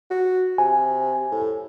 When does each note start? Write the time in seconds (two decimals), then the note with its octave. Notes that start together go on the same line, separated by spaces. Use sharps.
0.10 F#4
0.58 C3 G#5
1.31 A2